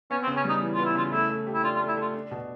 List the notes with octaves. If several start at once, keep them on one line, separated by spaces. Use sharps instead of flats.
B3 C#4
C4
C#3
C#4
G3 D#4
E3
B3 F4
E4
C#3 F4
A3 E4
A3
G4
E4
D4 F4
F4
A3
E4
A3 F4
D4
B2